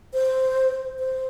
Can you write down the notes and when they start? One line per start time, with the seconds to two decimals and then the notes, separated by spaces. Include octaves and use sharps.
0.13 C5
0.99 C5